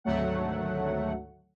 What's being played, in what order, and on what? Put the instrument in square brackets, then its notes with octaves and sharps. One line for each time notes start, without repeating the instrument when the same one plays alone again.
[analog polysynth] G#1 D2 F#3 A3 F#5